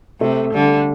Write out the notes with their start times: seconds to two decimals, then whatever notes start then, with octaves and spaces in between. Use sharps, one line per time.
0.21 C3 A3
0.53 D3 G3